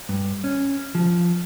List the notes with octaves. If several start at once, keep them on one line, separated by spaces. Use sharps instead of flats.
G2
C#4
F3